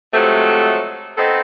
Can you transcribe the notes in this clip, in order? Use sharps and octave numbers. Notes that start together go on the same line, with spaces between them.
C3 F3 F#3 G#3 A3
B3 C4 D#4 A4